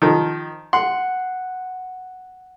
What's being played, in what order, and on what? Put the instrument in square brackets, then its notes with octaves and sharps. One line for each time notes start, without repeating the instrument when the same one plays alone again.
[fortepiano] D#3 F3
[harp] F#5 [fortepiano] C6